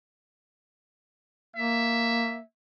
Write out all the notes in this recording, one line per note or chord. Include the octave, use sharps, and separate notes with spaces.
A#3 E5